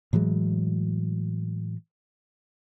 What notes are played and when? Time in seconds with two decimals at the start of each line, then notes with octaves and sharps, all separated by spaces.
0.13 A2 E3 F#3 G#3